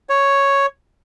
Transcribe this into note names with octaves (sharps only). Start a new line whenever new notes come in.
C#5